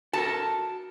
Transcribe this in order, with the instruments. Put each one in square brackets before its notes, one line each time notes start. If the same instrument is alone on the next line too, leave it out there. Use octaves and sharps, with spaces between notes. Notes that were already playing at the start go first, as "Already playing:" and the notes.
[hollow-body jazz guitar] F#4 A4 A#4 [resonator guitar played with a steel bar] A5